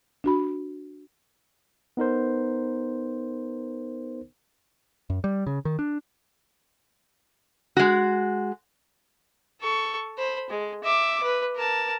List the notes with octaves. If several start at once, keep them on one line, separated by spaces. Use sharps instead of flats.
D4 F#4 B5
B3 D#4 A#4 C5
F#2
G3
C#3
D#3
D4
G#3 F#4
A4 C#6
C5 B5
G#3
E5 D6
B4
A#4 A5